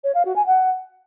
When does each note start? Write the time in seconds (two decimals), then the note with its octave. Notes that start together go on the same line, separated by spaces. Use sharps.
0.04 C#5
0.15 F5
0.25 F#4
0.36 G#5
0.47 F#5